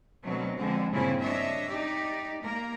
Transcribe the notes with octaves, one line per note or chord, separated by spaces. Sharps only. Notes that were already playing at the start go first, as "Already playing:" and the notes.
D2 B2 F#3 C4
F2 D3 G#3 C4
G2 A#2 C#3 C4 C#4 E4
D4 C#5 D#5 E5
D#4 G4 D5
A#3 A#4